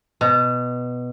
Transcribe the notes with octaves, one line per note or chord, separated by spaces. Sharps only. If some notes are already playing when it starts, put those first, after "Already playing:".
B2